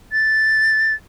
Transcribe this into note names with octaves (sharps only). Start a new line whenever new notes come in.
A6